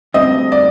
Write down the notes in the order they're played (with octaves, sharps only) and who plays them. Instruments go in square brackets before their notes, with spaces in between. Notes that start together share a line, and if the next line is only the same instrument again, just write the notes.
[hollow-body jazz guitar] D2 D3 G3 C4 [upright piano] D#5
[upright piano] D5